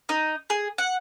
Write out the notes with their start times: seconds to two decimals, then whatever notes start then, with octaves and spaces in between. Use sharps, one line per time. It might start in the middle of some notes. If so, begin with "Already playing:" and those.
0.09 D#4
0.50 G#4
0.78 F#5